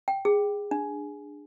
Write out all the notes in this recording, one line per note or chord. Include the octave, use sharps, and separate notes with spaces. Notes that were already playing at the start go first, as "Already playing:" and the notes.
G5
G#4
D4